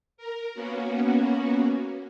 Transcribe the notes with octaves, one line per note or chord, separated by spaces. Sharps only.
A#4
A#3 B3 C#4 F#4